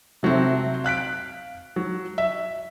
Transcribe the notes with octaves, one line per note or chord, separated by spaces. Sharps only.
C3 F#3 A3 C4
F5 F#6 B6 D7
F#3
E5